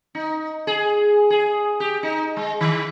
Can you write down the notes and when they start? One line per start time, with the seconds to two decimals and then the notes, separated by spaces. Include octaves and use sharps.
0.15 D#4
0.67 G#4
1.30 G#4
1.80 G4
2.03 D#4
2.37 G#3
2.61 D#3